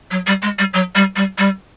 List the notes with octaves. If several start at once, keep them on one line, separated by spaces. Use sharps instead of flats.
F#3
G3
G#3
G3
F#3
G3
G3
G3